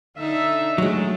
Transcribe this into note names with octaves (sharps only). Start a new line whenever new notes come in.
D3 D4 D#4 E5
F#3 G#3 A3